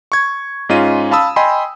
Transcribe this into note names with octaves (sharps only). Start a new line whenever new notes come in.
C#6 G#6
G#2 C#4 F4 D#5 D#7
F5 A5 B5 D#6 E6
D#5 G5 G#5 B5 C6